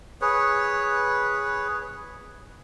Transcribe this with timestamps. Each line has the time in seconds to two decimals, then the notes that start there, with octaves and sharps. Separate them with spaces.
0.21 G#4 B4 C#5